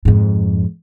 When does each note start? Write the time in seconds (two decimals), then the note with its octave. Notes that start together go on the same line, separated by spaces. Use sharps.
0.05 F2 G#2